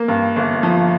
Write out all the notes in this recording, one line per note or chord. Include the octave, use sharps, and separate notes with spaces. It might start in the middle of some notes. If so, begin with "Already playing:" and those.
Already playing: A#3
G2
G1
F3